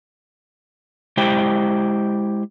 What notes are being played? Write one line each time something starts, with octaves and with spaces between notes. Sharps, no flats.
G#3 E4 G4 C5 G5